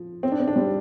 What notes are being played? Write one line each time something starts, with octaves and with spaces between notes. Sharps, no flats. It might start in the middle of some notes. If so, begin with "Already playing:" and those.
Already playing: F3
C4
D4
C4
D4
G3 C4